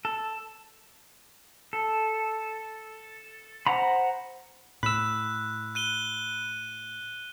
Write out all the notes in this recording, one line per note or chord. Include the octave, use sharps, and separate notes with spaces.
A4
A4
C5 F#5 A#5 B5
A2 B5 E6 F#6
F#6 D#7 G7